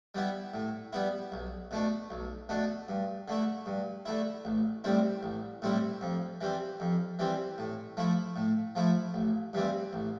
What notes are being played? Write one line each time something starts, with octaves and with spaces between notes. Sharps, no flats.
G3 B3 E4
A2
G3 B3 E4
B1
B2 A3 D4
B1
B2 A3 D4
G2
D3 A3 E4
G2
D3 A3 E4
A1
A2 G3 C4 E4
A1
A2 G3 C4 E4
F2
E3 G3 C4
F2
E3 G3 C4
A2
F3 A3 E4
A2
F3 A3 E4
A1
G2 E3 G3 C4
A1